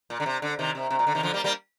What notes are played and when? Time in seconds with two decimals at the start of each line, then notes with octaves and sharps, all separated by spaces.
0.10 A#2
0.20 D3
0.26 C3
0.42 D3
0.59 C3 D#3
0.75 C3
0.91 C3
0.99 A#2
1.07 D3
1.15 C3 D#3
1.23 D3 F3
1.34 G3 A#3
1.44 G3 A#3